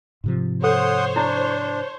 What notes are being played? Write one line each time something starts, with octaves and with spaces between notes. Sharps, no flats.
G#2 C3 F3
A4 C5 C#5 F#5 D#6
D4 E4